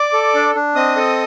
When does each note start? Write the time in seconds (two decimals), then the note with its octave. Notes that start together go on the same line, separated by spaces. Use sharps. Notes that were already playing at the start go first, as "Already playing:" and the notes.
Already playing: D5 D6
0.13 A4
0.35 D4
0.55 D4
0.75 C4 D#5 D#6
0.96 A4